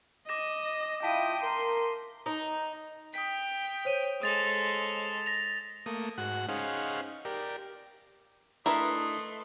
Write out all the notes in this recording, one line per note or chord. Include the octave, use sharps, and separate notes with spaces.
D#5 D6 A#6 E7
E4 F4 G5 A5 D#6 B6 D#7
A#4 C6
D#4
G5 D#6 B6
C5 C#5 D#7
G#3 A4 D#6 A6 F7
A#6 F7
A3 A#3 D#6
G#2 F#4 F#5
C#4 D#4 G#4 C5 F5 F#5
G4 A#4 D5
A3 D4 E4 A#4 B4 D#5 E5 C6